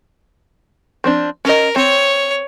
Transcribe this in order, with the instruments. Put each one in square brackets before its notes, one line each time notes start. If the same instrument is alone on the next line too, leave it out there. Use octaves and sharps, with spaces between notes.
[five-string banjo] F3 C4 D4
[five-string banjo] C#4 D#5 [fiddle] A#4
[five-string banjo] C4 [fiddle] C#5